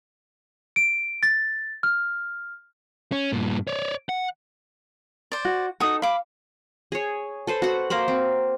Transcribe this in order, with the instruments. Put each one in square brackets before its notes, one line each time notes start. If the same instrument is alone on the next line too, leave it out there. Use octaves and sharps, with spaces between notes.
[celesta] D7
A6
F6
[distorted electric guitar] C#4
G2 A#2
C#5 D5
F#5
[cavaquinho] C5 D5
[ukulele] F#4
[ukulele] D#4 A4 [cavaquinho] F#4 D#6
[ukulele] F5 [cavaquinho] B5 D6
[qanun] G#4 C#5
A4 B4 C5
F#4 F#5
A#3 A#4 C5 B5
C4